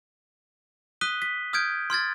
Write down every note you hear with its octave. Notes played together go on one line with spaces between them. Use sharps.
D#6 F#6 B6 D#7 G7
B6
D#6 F6 G6 G#6 D7
C6 F6 G#6 A6